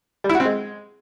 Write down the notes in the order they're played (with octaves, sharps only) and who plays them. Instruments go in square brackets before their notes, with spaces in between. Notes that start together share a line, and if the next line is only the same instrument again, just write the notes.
[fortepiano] G3
E4
F#4
C4
G#3